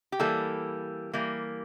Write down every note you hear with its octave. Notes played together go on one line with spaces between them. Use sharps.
G4
E3 G3 A#3 A4
E3 G3 A#3